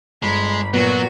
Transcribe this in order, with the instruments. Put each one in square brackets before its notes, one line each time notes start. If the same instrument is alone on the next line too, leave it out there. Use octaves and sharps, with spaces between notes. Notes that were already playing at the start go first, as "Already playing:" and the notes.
[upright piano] G1 [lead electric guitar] G#3 [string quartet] B5
[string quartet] A#2 F#4 [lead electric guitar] F#3 [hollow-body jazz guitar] B3